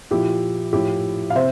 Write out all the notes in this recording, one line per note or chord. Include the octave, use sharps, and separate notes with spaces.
A#2 F3 E4 G4
A2 F3 E4 G4
F5
C3 C5 E5